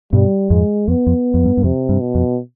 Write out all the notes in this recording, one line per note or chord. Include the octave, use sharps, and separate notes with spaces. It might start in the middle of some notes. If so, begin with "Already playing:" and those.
G2 B2 G3
F2 G#2 G#3
F2 B3
F2
F2
G2
G2
F2 C3
G2
B2
F2